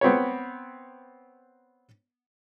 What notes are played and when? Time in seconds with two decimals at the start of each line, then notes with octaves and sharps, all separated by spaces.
0.01 B3 C4 B4 C#5